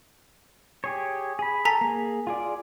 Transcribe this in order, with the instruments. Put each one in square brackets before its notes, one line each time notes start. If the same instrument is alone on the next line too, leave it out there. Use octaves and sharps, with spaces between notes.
[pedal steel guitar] G4 G#4 C#5
G#4 B5
[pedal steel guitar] A4 [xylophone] G#5 A#5 B6
[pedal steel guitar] A#3 G#4
F4 G#4 D5